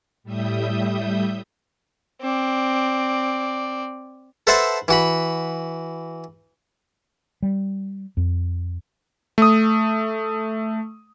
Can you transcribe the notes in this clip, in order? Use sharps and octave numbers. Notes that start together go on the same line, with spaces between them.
A2 G3 E5 D#6 G6
C4 D5
A4 B4 C5 E5 F#5 A5
E3 F#4 B5
G3
F2
A3 D#6